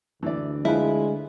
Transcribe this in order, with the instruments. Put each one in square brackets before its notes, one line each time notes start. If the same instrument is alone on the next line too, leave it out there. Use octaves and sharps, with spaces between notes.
[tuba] D2 [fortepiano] E3 D5
[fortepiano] F3 F4 B4 [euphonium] G#3 [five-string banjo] E4